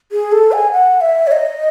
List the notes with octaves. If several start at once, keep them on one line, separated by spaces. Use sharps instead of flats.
G#4
A4
G#5
F#5
E5
C#5
D#5